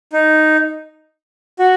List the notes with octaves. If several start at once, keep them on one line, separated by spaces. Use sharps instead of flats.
D#4
F#4